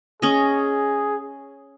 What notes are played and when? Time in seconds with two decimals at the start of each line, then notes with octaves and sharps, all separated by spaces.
0.22 C#4 G#4 D#5